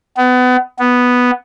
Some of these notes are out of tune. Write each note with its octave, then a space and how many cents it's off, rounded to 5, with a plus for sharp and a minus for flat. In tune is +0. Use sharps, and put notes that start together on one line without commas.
B3 +30
B3 +0